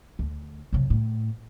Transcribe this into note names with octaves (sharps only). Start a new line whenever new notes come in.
D2
F#2 C3
A2